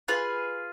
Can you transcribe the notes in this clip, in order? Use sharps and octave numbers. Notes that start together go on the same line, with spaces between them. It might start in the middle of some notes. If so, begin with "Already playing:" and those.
F4 G#4 B4